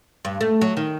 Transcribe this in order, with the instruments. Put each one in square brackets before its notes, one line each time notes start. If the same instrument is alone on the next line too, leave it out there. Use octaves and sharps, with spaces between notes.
[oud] G2
A3
F#3
D#3